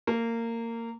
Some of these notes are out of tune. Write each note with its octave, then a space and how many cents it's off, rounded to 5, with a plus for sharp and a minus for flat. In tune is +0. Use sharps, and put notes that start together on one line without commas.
A#3 -20